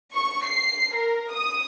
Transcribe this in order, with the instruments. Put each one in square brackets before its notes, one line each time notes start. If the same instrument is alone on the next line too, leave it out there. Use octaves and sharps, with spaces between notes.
[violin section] C#6
C7
A#4
D#6